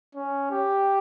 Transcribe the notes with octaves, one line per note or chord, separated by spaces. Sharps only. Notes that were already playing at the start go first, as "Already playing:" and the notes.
C#4
G4